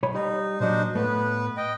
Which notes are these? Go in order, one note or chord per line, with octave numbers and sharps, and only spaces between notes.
B1 C#5 B5
G3 D#4
A#2 F#3 D4 D#4 C5
A2 A3 B3 B4
D#5 G5